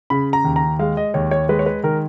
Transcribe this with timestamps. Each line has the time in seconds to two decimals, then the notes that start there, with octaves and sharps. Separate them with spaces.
0.10 C#3 B5
0.33 A#5
0.44 D#2
0.56 A#5
0.79 G#3 F5
0.97 D#5
1.14 D#2 C#5
1.31 C#5
1.49 G#3 B4
1.59 C#5
1.66 B4
1.83 D#3 A#4